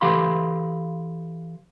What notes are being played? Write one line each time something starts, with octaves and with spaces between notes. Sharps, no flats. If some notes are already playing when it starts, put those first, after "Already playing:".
E3 G4 A4 F5 B5 C6